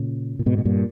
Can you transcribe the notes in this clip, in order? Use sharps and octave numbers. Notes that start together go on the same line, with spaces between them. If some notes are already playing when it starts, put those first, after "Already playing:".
Already playing: A#2 C#3
A#2
G#2 B2
B2
G2 A#2